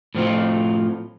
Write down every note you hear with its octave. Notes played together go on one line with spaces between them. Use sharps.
A2 F3 C4 F4